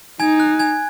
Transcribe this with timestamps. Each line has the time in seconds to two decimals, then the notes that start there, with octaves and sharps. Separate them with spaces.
0.20 D#4 G#5 G#6
0.40 F#6
0.59 G#5 G#6